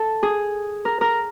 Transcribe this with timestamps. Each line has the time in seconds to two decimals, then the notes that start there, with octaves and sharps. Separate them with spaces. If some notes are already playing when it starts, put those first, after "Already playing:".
Already playing: A4
0.23 G#4
0.85 A#4
1.01 A#4